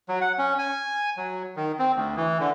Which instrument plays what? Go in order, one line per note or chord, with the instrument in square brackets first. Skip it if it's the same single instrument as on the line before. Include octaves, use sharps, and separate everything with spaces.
[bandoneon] F#3
F#5
C#4
G#5
F#3
D#3
C4
D2
E3
D3